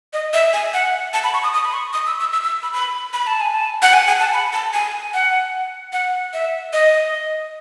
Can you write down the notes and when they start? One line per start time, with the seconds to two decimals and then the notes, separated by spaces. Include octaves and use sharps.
0.13 D#5
0.33 E5
0.53 G#5
0.74 F#5
1.13 A5
1.24 B5
1.34 C#6
1.44 D#6
1.54 D#6
1.64 B5
1.73 C#6
1.93 D#6
2.07 E6
2.20 E6
2.33 E6
2.43 E6
2.63 B5
2.73 B5
3.13 B5
3.27 A5
3.41 G#5
3.54 A5
3.82 F#5
3.93 G#5
4.07 G#5
4.20 A5
4.33 B5
4.53 A5
4.73 G#5
5.14 F#5
5.93 F#5
6.33 E5
6.73 D#5